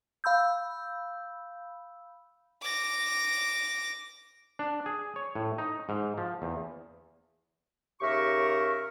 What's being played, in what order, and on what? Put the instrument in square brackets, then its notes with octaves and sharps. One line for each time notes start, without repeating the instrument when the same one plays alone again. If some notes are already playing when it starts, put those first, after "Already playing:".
[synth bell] F5 B5 E6 G6
[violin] D6 A#6
[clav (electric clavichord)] D4
G#4
C#5
A2
D#4
G#2
F3
E2
[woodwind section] D#2 C#3 G4 A#4 E5 C#6